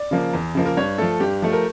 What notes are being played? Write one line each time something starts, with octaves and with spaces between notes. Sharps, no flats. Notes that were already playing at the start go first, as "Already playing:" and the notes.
Already playing: D5
C#3 F3 A#3
E2
C#3 F3 A#3
A#4
G2 C#5
F3 A3 A4
G2 G4
F3 A3
A#4